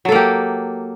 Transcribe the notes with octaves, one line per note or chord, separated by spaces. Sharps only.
F#3 A#3 G4 A4